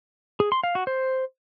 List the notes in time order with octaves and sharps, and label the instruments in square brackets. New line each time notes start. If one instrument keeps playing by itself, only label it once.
[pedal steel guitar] G#4
C6
F5
F#4
C5